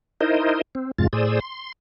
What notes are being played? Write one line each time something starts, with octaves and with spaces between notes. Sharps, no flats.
D#4 E4 A#4 C5 D#5
C4
F2 G#2 C3 G#3 F4 A6
A2 G#4 C5 D5 D#6 E6
C6